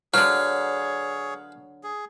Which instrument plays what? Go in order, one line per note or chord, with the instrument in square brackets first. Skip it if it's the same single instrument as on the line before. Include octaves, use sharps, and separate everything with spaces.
[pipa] D3 F#3 [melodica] G#4 C#5 [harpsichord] B4 F5
[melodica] G#4